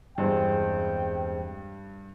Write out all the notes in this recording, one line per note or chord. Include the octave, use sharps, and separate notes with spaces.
E2 G2 G#3 C4 G5